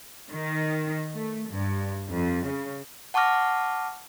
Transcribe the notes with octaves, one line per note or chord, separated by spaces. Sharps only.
D#3
A3
G2
F2
C#3
F#5 A5 C#6 D6 F6 A#6